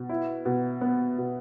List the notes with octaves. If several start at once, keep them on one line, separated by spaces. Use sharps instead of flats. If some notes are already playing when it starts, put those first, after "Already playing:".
Already playing: B2
E4
B2
B3
B2